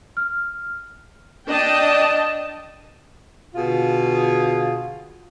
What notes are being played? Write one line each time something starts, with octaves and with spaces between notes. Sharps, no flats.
F6
D4 D#5 G5 A5
B2 D3 F4 G#4